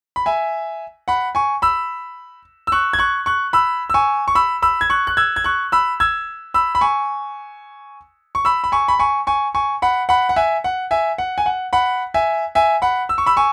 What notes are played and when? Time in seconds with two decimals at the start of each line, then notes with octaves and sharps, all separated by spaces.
0.16 B5
0.26 E5 G#5
1.08 F#5 B5
1.35 G#5 C#6
1.62 B5 E6
2.67 E6
2.72 C#6 F#6
2.93 G#6
2.99 C#6 F#6
3.26 C#6 F#6
3.53 B5 E6
3.90 E6
3.94 G#5 C#6
4.28 C#6
4.35 B5 E6
4.62 B5 E6
4.81 G#6
4.90 C#6 F#6
5.07 F#6
5.17 E6 G#6
5.36 G#6
5.44 C#6 F#6
5.72 B5 E6
6.00 E6 G#6
6.54 B5 E6
6.75 B5
6.81 G#5 C#6
8.35 C#6
8.45 B5 E6
8.64 B5
8.72 G#5 C#6
8.88 B5
8.99 G#5 C#6
9.27 G#5 C#6
9.55 G#5 C#6
9.82 F#5 B5
10.09 F#5 B5
10.29 F#5
10.36 E5 G#5
10.64 F#5
10.91 E5 G#5
11.18 F#5
11.38 G#5
11.46 F#5
11.73 F#5 B5
12.14 E5 G#5
12.55 E5 G#5
12.82 F#5 B5
13.09 E6
13.18 C#6
13.26 B5 E6
13.37 G#5 C#6